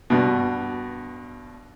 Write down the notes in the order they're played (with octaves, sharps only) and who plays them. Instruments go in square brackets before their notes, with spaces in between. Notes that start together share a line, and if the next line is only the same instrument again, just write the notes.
[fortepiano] G2 B2